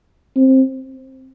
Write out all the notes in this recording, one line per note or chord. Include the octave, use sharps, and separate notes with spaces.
C4